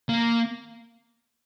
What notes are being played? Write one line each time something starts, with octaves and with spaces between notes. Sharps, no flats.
A#3